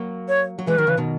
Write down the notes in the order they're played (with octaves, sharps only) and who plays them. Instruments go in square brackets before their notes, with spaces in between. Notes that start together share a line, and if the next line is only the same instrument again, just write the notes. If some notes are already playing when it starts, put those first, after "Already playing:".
Already playing: [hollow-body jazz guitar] F#3 A#3
[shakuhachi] C#5
[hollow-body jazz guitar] F#3
[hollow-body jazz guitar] E3 G#3 [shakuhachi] B4
[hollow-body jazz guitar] D#3 F#3 [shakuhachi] A#4
[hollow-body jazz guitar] C#3 E3 [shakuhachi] B4
[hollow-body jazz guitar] B2 D#3